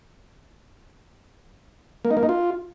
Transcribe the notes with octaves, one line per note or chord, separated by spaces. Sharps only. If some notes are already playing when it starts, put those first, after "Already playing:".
A#3
D#4
A#3
D#4
F4